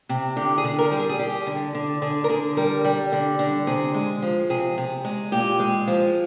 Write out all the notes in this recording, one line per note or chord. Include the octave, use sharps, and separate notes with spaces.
C3
D3 G4
G#4
D3
A#4
G3
G#4
G#4
G3 G4
D3
D3
D3 G#4
A#4
D3 G#4
G3 A#4
G3
D3
D3
C3 G#4
G#3
F3
C3 G#4
C3
G#3
A#2 G4
G#3
F3